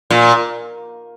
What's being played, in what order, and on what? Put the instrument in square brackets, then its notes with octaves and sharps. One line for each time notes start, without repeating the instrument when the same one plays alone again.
[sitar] A#2